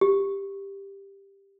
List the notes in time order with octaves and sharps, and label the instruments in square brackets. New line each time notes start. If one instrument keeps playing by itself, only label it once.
[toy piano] G4